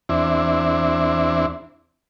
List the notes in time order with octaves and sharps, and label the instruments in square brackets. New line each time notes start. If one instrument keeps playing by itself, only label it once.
[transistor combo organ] E2 C4 D4 E4